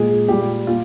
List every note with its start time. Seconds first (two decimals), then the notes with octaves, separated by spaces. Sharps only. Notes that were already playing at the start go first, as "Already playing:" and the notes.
Already playing: A#2 G#3 G#4
0.28 A#2 G3 G4
0.67 A#2 F4